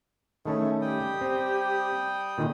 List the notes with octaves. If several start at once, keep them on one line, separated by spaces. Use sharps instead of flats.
D#3 A3 C#4 E4 G#4 A4
G3 G4 G5 D#6
C4
A#2 D3 D#3